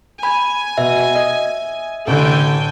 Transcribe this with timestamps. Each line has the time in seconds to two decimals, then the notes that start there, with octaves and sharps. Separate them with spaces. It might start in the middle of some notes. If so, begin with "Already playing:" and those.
0.23 G#5 B5
0.78 B2 E5
1.15 D#5
2.07 A1 D3 A4 G5 G#5